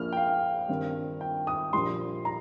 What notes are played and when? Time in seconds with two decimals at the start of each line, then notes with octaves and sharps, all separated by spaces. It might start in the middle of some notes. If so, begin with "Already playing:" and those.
Already playing: A#1 A#2 A#3 F6
0.13 G5
0.17 F5
0.69 G2 D#3 C4
1.21 G5
1.47 D#6
1.73 A#1 A#2 G3 C6
2.25 A#5